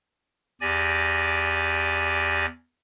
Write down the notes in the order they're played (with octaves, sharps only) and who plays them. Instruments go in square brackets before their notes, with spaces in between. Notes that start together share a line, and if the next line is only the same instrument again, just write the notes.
[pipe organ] E2 G4 D5 G#5 A#6